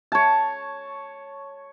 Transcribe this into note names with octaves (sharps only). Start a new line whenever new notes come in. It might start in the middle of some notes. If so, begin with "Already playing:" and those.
C#5 A5